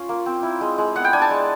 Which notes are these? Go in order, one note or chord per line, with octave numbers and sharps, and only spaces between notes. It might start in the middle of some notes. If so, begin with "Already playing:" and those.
Already playing: C#4 F4 C6
A#3
C4
E4
G#3
G#3
B3 F#5
G5
D4 G#5
A5
G#3